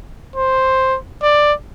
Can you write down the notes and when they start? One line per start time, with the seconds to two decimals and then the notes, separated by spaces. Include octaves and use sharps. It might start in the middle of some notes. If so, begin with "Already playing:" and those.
0.36 C5
1.22 D5